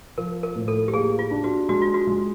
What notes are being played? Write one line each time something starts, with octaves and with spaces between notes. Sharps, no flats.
F3 A#4
A#4
A2
A4
G4
A#3 G#4
F4
D4
F#4
G#3 F#4
F4
F#4
G#3